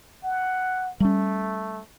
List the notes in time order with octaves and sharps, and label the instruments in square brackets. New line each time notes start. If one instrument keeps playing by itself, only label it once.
[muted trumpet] F#5
[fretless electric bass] G3 C#4 [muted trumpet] A3